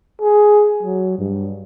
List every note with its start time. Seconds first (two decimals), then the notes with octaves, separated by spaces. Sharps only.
0.22 G#4
0.83 F#3
1.19 G2